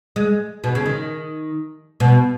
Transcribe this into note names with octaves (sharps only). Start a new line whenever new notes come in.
G#3
B2
C#3
D#3
B2